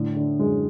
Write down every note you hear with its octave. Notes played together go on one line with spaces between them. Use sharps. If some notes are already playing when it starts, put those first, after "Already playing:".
Already playing: A2 D3
D3
F#2 G#3